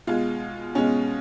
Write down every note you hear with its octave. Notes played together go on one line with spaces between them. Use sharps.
B2 G#3 F4
B2 G#3 C#4